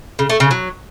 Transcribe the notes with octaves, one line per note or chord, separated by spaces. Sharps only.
C#3
A3
C#3
F#3